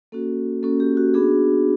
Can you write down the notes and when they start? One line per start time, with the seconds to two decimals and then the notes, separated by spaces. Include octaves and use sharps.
0.12 A#3 C#4 F#4 A4
0.63 A#3 C#4 F#4 A4
0.80 G4
0.97 F#4
1.14 B3 D4 F#4 G#4